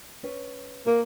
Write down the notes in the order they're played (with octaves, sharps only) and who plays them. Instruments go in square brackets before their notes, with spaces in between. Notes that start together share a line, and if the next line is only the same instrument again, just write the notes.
[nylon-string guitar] C#4 B4
[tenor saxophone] A#3 [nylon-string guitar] A#4